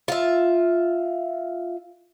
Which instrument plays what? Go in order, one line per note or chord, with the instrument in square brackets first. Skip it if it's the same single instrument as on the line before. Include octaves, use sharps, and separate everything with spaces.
[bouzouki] F4 E5